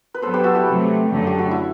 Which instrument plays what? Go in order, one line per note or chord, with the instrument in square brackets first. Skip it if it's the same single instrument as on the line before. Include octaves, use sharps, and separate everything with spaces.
[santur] B4
[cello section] G2 F#3 B3 [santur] A4 C5
[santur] G4 B4
F#4 A4
E4 G4
[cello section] C3 F#3 A3
F#2 D3 F#3 A3
[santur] G4
F#4
E4